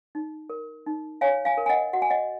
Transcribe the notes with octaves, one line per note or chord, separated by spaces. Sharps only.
D#4
A#4
D#4
C#5 F5 G#5
F5 G#5
A#4
G#5
D#5 F#5
F#4 F#5
G#5
D#5 F#5